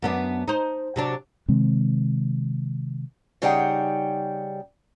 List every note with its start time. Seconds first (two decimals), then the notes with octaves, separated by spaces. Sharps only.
0.02 F#2 B3 D4
0.48 D#4 C5
0.96 C3 F#3 D4
1.48 C3 D#3 G#3 C4
3.42 C#3 G3 D#4 G#4 F#5 G5